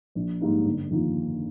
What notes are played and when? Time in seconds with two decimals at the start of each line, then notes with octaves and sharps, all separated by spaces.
0.15 A#1
0.40 G#2 G3 A#3 D#4
0.65 G1
0.90 F2 D#3 A#3 F4